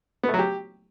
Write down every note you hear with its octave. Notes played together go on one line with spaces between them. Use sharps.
B3
A3
F#3
G4